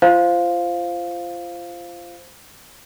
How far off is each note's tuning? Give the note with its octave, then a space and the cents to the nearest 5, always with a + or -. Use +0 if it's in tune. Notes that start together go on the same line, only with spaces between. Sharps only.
F4 -25 C5 +0 F5 +0